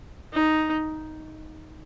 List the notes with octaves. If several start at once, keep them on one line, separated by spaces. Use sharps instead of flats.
D#4